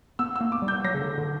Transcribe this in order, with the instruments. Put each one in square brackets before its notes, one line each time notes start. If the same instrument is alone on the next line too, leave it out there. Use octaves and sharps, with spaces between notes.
[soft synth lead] B3 [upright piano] E6
[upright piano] E6
[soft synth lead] A#3
[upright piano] D6
[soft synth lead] G3
[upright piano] G6
[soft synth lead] F#3 [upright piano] A#6
[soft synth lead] C#3
D3
D3